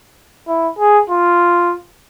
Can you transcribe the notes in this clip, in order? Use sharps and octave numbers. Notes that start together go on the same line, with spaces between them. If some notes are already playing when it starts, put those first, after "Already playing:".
E4
G#4
F4